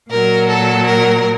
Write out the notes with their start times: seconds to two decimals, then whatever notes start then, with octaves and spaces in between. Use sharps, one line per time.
0.11 A#2 F#3 A#4
0.48 A4
0.86 A#4